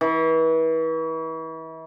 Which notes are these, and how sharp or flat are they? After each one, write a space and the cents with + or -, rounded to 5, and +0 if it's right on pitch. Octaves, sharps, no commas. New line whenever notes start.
E3 -35